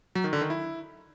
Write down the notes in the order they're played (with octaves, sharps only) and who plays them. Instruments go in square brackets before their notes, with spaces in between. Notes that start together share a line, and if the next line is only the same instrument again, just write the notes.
[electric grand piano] F#3
D#3
D3
D#3
E4